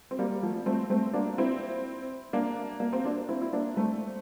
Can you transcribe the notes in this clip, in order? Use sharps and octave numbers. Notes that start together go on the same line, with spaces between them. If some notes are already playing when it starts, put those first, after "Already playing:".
C4
G3 A#3
F3 A3
A3 C4
A3 C4
A#3 D4
C4 E4
A#3 D4
A#3
C4
A#3 D4
C4 E4
E4
A#3 D4
A3 C4